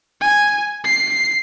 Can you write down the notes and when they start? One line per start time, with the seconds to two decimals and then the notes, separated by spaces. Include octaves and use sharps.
0.21 G#5
0.84 C7